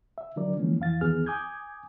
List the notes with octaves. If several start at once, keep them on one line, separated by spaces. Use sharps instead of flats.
E5
D3 F#3 D4 A#4 D5
D3 E3 F3 G#3 A#3 C#4
F2 E3 F5 A6
E2 D#3 B3 G#4 F6
G#5 D6 D#6 G6 G#6